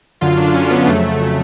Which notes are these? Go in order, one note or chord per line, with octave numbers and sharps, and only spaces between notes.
F#2 D3 F#3 F4
D4
C#4
B3
F2 C#3 F#3 A3
A3